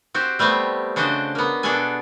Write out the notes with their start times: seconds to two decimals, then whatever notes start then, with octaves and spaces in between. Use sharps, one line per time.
0.14 C4 F#4 G4 C5
0.39 G3 A3 B3 C4
0.96 C#3 D4 F#4 C5 D#5
1.35 A#3 B3
1.63 B2 D4 F#4 G#4 A4 G#5